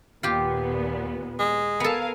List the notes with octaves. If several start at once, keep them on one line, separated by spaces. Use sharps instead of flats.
D#2 A#2 B3 F4 G4
G#3
B3 A4 A#4 F5 G#5